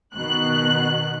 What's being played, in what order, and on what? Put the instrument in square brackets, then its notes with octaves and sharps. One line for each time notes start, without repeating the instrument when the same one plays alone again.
[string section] B2 D#3 F#6